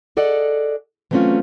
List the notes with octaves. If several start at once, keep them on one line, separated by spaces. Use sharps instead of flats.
G#4 A4 D5 D#5 F#5
E3 F#3 A3 C4 C#4 F4